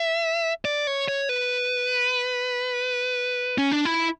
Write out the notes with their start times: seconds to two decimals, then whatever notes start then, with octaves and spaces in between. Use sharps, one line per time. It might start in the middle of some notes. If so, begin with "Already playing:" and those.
Already playing: E5
0.65 D5
0.87 C#5
1.08 C#5
1.29 B4
3.58 C#4
3.72 D4
3.85 E4